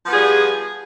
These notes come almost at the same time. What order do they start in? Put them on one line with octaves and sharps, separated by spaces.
F3 B3 F4 G#4 G3